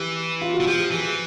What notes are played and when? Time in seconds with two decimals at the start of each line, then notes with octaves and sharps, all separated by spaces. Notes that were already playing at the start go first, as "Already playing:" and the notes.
Already playing: E3 G4
0.41 F4
0.53 F#4
0.61 E3
0.67 F3 G4
0.91 E3 G#4